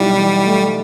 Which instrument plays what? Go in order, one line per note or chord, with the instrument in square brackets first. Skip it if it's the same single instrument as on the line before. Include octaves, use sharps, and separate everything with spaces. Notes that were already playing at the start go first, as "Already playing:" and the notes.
Already playing: [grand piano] B1 E4 [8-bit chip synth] G3
[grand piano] E3
A3